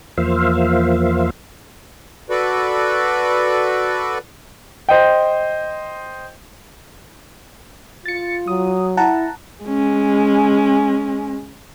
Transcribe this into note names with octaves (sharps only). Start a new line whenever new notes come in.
E2 F3 A#3 C5 E5 F5
F#4 A4 B4 D5
C5 D#5 G5
F4 A6 C#7
F#3 D#6
E4 F#5 A5 A#5
G#3 C#4